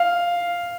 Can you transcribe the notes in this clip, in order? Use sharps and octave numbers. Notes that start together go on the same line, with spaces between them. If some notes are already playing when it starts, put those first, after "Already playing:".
Already playing: F5